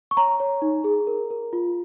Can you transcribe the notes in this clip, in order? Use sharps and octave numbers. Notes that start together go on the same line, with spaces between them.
C#6
C#5 A#5
C#5
D#4
G#4
A#4
A#4
F4